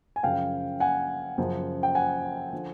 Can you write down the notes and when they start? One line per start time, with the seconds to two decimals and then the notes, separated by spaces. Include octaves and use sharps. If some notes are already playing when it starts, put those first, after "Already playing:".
0.16 G#5
0.23 F#2 C#3 F3 F5 G5
0.80 F#5 G#5
1.38 F#2 C#3 F3
1.83 G5
1.95 F#5 G#5
2.53 D3 F3